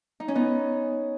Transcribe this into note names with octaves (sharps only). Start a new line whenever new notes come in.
D#4
C#4
B3 D#4